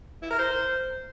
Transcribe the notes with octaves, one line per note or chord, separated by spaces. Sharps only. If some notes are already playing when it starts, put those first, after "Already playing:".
E4
A#4
C5